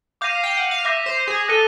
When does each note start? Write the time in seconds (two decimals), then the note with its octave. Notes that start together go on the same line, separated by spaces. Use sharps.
0.21 F5 D6 G6 A#6 D#7
0.43 G5
0.57 F#5
0.71 F5
0.85 E5 D6 G6 A#6 D#7
1.06 C5
1.27 G#4
1.48 A4 F#6 A#6 D#7 G7